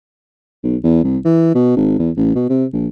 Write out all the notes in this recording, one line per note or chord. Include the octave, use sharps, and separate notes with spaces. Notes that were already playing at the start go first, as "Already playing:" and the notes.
B1
E2
C2
E3
B2
G#1
E2
A1
B2
C3
A#1